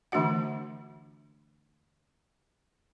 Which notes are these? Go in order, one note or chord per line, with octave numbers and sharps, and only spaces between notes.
D3 E3 A3 D4 F#4 F#5